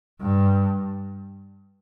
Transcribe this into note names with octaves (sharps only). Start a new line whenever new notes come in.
G2